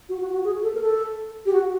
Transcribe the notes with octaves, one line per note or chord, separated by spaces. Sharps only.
F#4
F#4
F#4
G#4
A4
A#4
A4
G4
F#4